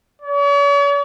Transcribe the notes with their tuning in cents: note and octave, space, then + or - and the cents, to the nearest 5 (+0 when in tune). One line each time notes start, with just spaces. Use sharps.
C#5 +45